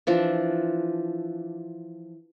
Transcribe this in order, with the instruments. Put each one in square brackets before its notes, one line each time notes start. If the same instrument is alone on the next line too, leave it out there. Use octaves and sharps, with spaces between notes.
[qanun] E3 F3 D4